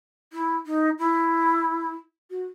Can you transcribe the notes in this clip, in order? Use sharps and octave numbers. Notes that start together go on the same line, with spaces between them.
E4
D#4
E4
F#4